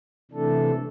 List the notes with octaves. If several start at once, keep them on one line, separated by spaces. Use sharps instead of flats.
C3 E3 A3 D4 A4